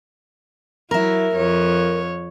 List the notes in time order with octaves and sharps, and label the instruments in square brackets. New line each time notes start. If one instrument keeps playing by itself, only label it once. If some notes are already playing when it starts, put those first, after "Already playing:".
[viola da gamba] F#3 E4 [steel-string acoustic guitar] A#4 E5
[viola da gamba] F2 C#5